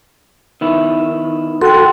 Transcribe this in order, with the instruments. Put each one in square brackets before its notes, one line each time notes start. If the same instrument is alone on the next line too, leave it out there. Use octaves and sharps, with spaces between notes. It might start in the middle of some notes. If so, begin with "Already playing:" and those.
[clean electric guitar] D#3 B3 E4
[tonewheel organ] F#4 A4 [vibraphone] G5 C6